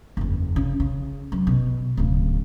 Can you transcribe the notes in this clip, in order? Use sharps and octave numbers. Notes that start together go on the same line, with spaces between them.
F#1 E2
C#3
C#3
F#2
B2
D1 C#3